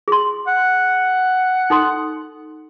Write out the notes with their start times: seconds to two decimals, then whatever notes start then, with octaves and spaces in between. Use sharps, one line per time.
0.08 G#4 C6
0.47 F#5
1.70 D#4 A4 C6